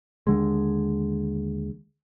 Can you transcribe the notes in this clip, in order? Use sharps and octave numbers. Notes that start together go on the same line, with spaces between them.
D#2 D3 G#3